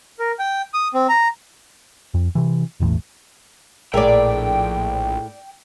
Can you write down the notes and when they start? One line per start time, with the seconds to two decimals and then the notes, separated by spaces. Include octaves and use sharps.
0.19 A#4
0.39 G5
0.74 D#6
0.94 C4
1.09 A#5
2.14 F2
2.35 C3 E3
2.80 E1 A1 E2 A2
3.94 A#1 A2 G#4 A#4 D5 E5 G5